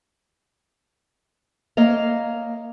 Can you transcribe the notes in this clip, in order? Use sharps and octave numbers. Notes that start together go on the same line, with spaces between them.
A#3 C#5 D#5 F5